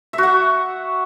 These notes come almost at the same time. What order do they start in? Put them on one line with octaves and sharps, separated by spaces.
E5 F#4 F#5